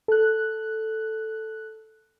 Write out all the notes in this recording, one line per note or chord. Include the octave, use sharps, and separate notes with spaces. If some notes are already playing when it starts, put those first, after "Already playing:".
A4 F#6